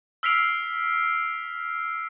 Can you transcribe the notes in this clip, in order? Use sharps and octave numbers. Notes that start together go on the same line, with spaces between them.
E6 F6 B6 C7 D7 F7